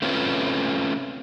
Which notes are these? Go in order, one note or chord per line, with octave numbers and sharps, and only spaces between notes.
A3 C4 C#4 F4 B4